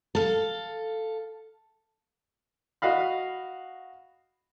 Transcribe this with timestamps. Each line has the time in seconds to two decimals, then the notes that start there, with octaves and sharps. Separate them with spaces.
0.15 A4 F5
2.82 F#4 D#5 F5 B5